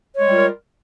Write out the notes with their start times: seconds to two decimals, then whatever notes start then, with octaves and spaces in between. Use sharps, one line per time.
0.16 C#5
0.20 G#3
0.25 G3
0.30 F4
0.34 A#4